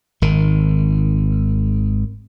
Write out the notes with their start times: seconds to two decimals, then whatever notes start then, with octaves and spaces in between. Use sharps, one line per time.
0.22 G#1 D#3